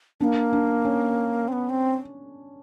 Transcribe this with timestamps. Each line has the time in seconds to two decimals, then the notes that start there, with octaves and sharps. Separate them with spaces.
0.20 A#3 B3 D4
0.53 D4
0.85 C#4
1.48 C4
1.52 B3
1.70 C4